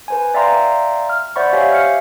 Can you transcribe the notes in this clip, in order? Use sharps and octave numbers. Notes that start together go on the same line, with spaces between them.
B4 C5 G#5
D5 E5 F5 G5 A#5 C6
F6
C5 D5 E5 F#5 B5 C#6
G4 C5 C#5 E5 F5 G#5
F5 F6 C#7